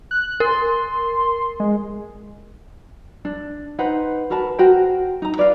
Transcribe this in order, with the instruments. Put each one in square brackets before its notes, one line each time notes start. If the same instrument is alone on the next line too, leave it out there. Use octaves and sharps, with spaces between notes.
[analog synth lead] F#6
[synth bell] A#4 [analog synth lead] C6
[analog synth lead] G#3
[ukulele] D4
D#4 B4 C5 F#5
F#4 A#4 B4 A5
F#4 A#4 C5 G5
D#4 A#5
B4 D5 D#5 F5